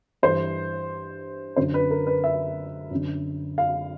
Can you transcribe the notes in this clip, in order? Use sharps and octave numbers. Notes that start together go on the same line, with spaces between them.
G2 E3 C5
F#2 D3 C5
B4
A#4
B4
E5
F#2 D3
F5